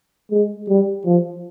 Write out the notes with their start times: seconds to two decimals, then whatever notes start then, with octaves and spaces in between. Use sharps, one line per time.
0.31 G#3
0.68 G3
1.06 F3